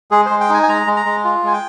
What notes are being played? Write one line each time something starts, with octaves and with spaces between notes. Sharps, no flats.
G#3 G#4
G#3 C5
G5
D#4 G#5
G#5
G#3 A#5
G#3
A#5
G#3
F4
G#3 G#5
G5